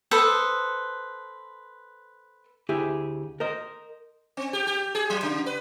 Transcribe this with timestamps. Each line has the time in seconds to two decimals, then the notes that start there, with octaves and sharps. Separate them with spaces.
0.11 A4 B4 C5 D#6
2.69 D2 E4 G4 G#4 E5
3.40 A#4 C5 D#5
4.37 C4
4.53 G4
4.67 G4
4.95 G#4
5.10 F#3
5.23 C#3
5.46 B4